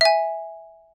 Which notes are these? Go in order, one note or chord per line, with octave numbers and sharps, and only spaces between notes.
E5 G#5